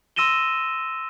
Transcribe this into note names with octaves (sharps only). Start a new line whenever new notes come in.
C6 E6 A#6 D#7 E7 G7